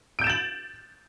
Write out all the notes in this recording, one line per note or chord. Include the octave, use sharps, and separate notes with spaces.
G6 A6 D7 E7 F#7